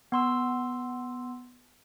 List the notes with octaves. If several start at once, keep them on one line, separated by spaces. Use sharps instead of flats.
B3 C6 E6